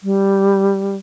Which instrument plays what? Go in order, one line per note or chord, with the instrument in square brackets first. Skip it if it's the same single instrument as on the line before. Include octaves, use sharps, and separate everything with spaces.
[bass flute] G3